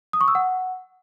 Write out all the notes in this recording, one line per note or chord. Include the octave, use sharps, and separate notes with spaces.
D#6
C#6
E6
F#5